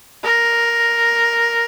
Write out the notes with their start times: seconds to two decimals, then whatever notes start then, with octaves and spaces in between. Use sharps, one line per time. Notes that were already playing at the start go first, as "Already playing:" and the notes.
0.24 A#4